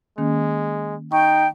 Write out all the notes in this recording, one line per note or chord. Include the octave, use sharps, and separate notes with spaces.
D#3 G#3 A#3 C#4
D#4 G5 C#6